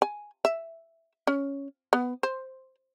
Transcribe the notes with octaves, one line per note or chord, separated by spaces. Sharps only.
G#5
E5
C#4
B3
C5